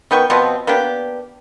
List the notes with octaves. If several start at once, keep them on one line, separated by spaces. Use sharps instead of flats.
D#3 B3 G5 C#6
B2 F3 B3 C4
A#3 B3 D4 G4